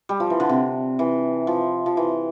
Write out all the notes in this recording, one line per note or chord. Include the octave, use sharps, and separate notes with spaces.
G3
F3
E3
D3
C3
E3
F3
F3
E3